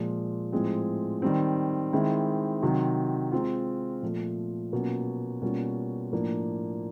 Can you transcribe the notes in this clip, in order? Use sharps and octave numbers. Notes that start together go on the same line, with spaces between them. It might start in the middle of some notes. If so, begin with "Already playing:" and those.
Already playing: A#2 F3 G#3
A2 F3 G#3 C4
D#3 G3 C4
D#3 G#3 C4 E4
C3 D#3 F#3
G#3 C4 F4
A#2 F3 A3
B2 F#3 A#3 C#4 F4
B2 G3 A#3 C#4 F4
A2 F3 A#3 D4